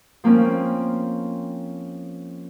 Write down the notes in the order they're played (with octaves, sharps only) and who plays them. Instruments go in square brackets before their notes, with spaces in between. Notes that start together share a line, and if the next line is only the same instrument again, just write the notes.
[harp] F3 A#3 C4 C#4